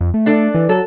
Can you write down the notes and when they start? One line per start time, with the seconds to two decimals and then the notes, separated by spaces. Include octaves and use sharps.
0.01 F2
0.14 A3
0.26 D4 A4 D5
0.54 E3
0.69 F#3 A4